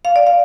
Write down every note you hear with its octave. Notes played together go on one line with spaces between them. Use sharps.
F5
D5
F5